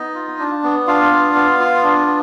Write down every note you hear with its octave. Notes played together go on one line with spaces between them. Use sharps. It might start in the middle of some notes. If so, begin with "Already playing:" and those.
Already playing: B3 D#4 D#5
F4
D4
B3
D4 F4 F5
B3
B3
F4
D4
B3